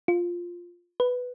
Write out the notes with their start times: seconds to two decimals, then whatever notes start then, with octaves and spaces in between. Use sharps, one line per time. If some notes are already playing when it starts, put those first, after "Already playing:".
0.08 F4
1.00 B4